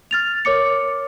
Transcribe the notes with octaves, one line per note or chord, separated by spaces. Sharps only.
F6 A6 F7
A#4 C#5 D6 C#7